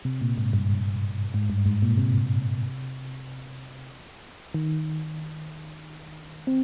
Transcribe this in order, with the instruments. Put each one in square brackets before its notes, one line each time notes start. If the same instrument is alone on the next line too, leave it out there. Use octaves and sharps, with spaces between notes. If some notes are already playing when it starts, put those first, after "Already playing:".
[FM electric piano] C3
A#2
G#2
G2
G2
G#2
G2
G#2
A#2
C3
D#3
C4